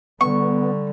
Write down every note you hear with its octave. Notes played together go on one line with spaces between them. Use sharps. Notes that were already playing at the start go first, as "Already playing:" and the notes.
D3 G3 B3 C#6